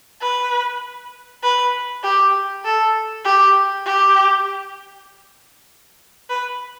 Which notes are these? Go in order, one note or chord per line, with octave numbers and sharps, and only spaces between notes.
B4
B4
G4
A4
G4
G4
B4